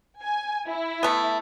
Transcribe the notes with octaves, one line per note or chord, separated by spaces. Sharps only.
G#5
E4
A3 B3